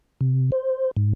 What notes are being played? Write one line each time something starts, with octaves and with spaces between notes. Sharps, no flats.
C3
C5
G#2